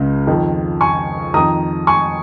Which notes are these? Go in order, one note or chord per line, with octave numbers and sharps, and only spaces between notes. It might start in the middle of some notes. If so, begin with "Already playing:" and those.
Already playing: C#2 C#3
F2 D#3
G#5 C#6
F2 D#3 A#5 D#6
G#5 C#6